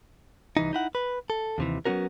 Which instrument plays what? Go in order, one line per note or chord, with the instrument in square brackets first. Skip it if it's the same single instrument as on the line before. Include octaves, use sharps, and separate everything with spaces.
[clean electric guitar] C2 E3 D#4
D#4 E4 F#5
B4
A4
D#2 C3 E3
F#3 A3 B3 C#4 F#4 A#4